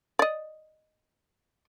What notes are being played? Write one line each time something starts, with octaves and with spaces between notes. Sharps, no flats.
D5 D#5